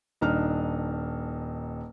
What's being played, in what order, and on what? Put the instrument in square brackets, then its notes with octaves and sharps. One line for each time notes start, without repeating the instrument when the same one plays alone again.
[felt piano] D#1 D4 D#4 F6